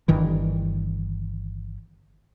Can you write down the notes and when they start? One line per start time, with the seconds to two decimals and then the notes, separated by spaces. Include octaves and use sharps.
0.08 G1 G2 D#3 E3